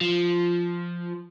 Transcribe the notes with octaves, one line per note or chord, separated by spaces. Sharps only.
F3